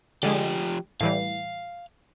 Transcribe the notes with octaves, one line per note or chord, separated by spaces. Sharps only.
D3 F3 G#3 G4
A2 E3 G3 F5